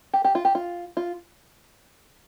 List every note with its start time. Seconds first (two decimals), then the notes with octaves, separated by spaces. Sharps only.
0.14 G4
0.25 G4
0.35 F4
0.45 G4
0.55 F4
0.97 F4